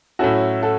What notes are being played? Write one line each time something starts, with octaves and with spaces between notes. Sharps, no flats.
A2 F#3 C#4 E4 F#4 A4
F#4 A4